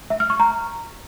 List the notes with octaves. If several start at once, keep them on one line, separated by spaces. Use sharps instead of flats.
E5
F6
C#6
A#5